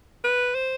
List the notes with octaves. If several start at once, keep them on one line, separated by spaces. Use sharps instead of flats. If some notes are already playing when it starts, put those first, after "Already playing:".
B4
C5